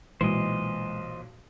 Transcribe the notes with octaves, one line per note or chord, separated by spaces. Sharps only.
B1 A#2 E3 G#3 C5 D#5